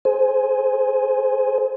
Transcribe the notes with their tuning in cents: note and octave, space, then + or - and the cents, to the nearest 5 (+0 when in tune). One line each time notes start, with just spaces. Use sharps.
G#4 +40 C5 +0 G#5 +15